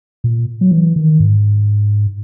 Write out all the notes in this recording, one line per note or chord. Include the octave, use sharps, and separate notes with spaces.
A#2
F#3
E3
D#3
G#2